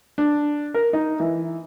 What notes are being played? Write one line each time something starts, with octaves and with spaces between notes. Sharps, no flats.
D4
A#4
D#4
E3